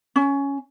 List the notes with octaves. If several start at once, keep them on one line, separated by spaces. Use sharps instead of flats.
C#4